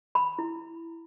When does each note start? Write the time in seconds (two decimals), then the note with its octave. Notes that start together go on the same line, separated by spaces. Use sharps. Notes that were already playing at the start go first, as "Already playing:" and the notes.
0.15 B5
0.39 E4